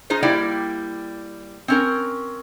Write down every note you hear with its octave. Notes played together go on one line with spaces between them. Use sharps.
D#4 F4 G#4 C5
G3 A#3 E4 D5 G5
C4 C#4 A#4